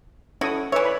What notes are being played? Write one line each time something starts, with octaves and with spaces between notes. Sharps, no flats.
C#4 E4 F#4 A4 D#6
E3 B4 C#5 E5
D5 B5